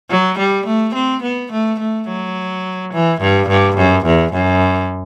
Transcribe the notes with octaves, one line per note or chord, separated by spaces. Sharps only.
F#3
G3
A3
C4
B3
A3
A3
F#3
E3
G2
G2
F#2
E2
F#2